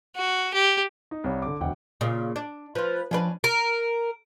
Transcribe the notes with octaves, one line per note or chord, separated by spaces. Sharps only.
F#4
G4
D#4
C2 G3 C#5
D3 D6
E1 D2 F#5 G5
A#2 C#3
D4
F3 F4 B4
F3 C#4 D4 B4
A#4